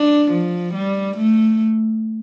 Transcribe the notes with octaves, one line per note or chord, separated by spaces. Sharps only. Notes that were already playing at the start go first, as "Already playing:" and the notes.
Already playing: D4
F3
G3
A3